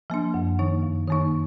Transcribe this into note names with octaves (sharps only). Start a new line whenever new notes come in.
F3 A#3 D4
F#2
D#3 A#3 D#4
F2
D#3 A#3 D#4